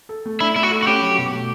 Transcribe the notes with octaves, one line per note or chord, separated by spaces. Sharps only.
A4
A3
D4 E4
A3 E4
F#4
A4
F#4
C#4 G4
F#3
B2
A3